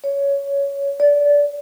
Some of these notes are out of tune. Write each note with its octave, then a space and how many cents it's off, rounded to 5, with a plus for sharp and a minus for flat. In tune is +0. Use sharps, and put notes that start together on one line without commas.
C#5 +15
D5 -20